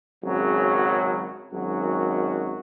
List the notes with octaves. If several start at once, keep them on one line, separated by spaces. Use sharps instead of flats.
G#1 F#2 C#3 F#3
G#1 F#2 D#3 F#3 F#4